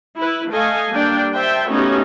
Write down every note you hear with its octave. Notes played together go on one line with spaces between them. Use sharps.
E4 B4
A3 A4 D#5 F5 G#5
G3 A#3 D4 G5
C5 E5 G5 A5
A3 B3 C#4 D#4 F#4 G4